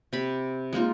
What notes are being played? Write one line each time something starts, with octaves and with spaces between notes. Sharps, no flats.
C3 B5
G#3 A#3 D#4 F4